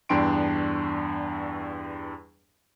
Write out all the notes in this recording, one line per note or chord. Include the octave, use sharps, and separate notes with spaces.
E2 G2 D4 G5 C6 D7